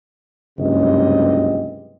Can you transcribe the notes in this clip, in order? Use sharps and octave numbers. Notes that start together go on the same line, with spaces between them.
F#1 C#2 G2 C3 G4 D#5